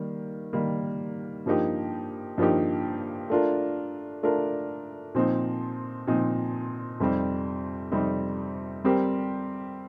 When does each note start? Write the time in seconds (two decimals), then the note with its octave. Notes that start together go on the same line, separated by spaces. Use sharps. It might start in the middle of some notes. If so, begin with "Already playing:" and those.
Already playing: D#3 G3 A#3
0.53 D#3 G3 A#3
1.46 G2 F3 A#3 D#4 G4
2.38 G2 F3 A#3 D#4 G4
3.30 A3 D4 F4 A#4
4.23 A3 D4 F4 A#4
5.15 A#2 F3 C4 D#4
6.07 A#2 F3 C4 D#4
7.00 F2 C3 G3 C4 D#4
7.92 F2 C3 G3 C4 D#4
8.84 G3 C4 G4 A#4